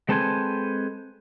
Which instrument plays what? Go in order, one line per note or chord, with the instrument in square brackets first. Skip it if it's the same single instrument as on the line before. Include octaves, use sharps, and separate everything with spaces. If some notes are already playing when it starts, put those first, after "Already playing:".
[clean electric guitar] G#3 C4 A4 B4 C5 G#5